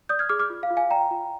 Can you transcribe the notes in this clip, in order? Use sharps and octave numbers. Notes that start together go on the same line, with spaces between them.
D5 D#6 G6
F6 G#6
G#4 D6 F6
D6 F6
F4
F5
F4
F5 G#5
D5 G5 A#5
F4